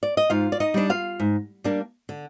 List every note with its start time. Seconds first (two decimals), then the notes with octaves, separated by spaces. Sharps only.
0.03 D5
0.17 D#5
0.30 G#2 F4 F5
0.52 D5
0.60 D#4 D#5
0.74 G3 A#3 D4
0.90 F4 F5
1.20 G#2
1.64 G3 A#3 D4
2.09 D3